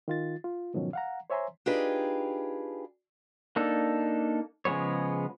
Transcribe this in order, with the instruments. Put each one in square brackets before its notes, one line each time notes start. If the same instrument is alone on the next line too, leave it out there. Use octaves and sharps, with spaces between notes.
[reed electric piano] D#3 F4 A6
F4
G#2 B2 D#3 F3 F#3 C#4
F5 F#5 A#5
C5 C#5 E5 G#5 A#5 C6
[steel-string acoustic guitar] D4 D#4 F4 G4 G#4 B4
[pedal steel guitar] A#3 D4 D#4 A4
C#3 F3 G#3 B3 C#5